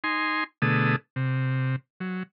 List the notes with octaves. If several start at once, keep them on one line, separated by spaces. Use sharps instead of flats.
D#4 G#5 C6
B2 D3 A3 G#4 A4 D#6
C3
F#3